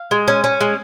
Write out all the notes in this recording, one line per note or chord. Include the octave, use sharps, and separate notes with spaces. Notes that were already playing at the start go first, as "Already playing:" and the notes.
Already playing: F5
G#3
C#4
C#4
G#3